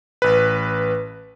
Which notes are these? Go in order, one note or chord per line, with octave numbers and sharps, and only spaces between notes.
A1 B4